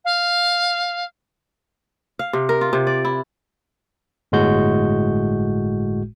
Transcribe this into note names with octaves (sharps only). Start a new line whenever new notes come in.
F5
F5
C3
A#4
F4
C3
D5
E4
G1 A2 G#3 F#4 G6